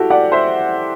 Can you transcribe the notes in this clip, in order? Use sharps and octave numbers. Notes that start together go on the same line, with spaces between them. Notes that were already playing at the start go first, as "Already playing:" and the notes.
Already playing: E4 F#4 G4 A4
D5 F#5
C5 E5